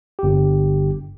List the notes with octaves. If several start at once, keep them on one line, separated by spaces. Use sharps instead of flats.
G1 G4